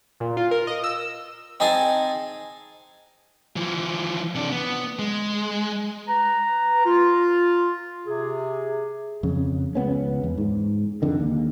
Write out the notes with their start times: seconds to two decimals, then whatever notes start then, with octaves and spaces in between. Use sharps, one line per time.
0.20 A#2
0.37 F4
0.51 A#4
0.67 D#5
0.84 E6
1.60 C4 D#4 G#4 G#5 A5
3.56 E3 F3
4.35 C3 D4
4.52 B3
4.99 G#3
6.08 B4 A#5
6.85 F4
8.06 C3 G#4
9.23 F2 C#3
9.75 C#2 B3 C#4
10.23 E2
10.38 G#2
11.02 F2 D3 D#3
11.20 D#2